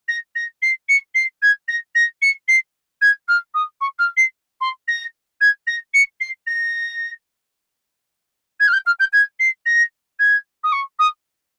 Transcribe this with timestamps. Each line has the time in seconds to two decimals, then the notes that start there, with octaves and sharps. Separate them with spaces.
0.08 A#6
0.35 A#6
0.62 C7
0.88 C#7
1.14 C7
1.42 G#6
1.68 A#6
1.95 A#6
2.22 C#7
2.48 C7
3.01 G#6
3.28 F6
3.54 D#6
3.81 C#6
3.98 F6
4.16 C7
4.61 C6
4.88 A#6
5.41 G#6
5.67 A#6
5.93 C#7
6.20 C7
6.47 A#6
8.60 G#6
8.67 F6
8.73 G6
8.86 F6
8.99 G6
9.13 G#6
9.39 C7
9.66 A#6
10.19 G#6
10.63 D#6
10.72 C#6
10.99 D#6